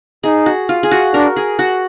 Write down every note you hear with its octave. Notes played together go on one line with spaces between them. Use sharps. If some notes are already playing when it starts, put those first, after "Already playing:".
D#4 G#4
F#4
F4
G#4
F#4
D4 A#4
G#4
F#4